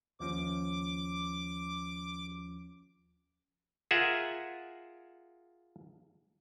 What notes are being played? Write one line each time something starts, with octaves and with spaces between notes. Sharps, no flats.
D#2 F3 C#4 D6
F4 G#4 A#4 E5 F#5